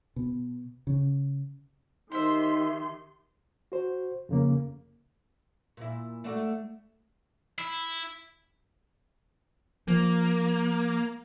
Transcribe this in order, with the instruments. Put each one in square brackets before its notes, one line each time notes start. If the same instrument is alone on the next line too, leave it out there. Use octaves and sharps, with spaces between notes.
[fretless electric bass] B2
C#3
[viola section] D#3 G4 C6 [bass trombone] D#4 [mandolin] C5 E5
[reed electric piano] F#4 C5
F2 C#3 A#3
[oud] A#2 E4
A3 D4 F#4
[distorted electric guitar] E4
[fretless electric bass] F3 [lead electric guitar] A#3